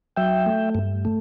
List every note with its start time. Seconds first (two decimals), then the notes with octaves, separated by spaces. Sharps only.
0.17 F#3 E5 G5
0.46 A3
0.75 G2
1.05 A3